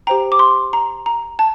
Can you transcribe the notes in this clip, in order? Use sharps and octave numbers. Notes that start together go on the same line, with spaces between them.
G4 C5 G5 A#5
D6
C6
A#5
A#5
A5